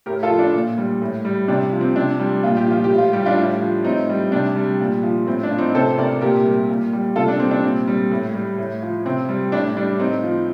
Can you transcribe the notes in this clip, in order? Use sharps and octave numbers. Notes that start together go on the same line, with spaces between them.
A2 G4 A#4
F4 A4
F3
D4
A#2
G3
A2
G3
C3 D4
F3
C4
C3 D4
G3
A#2 F4
G4
F3 F4
G4
A2
F4
G3 G4
D4 F4
A2
F3
A2 C4 D#4
G3
C3 D4
G3
A#2
F3
A2 C4
D4
F3
C4 D#4
C3 A4 C5
C3 A#4 D5
A#2 G4 A#4
G3
A#2
G3
C3 F4 A4
D4
G3 C4
D4
A#2 C4
G3
A2
G3
A2
F3
C3 C4
G3
A2 D4
G3 D4
A2 C4 D#4
F3